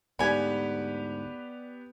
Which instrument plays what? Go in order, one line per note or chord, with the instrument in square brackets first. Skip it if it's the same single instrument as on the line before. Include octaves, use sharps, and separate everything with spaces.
[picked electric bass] D2 G#2 [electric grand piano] B3 G4 B4 [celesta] D5 [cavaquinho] G#5 B5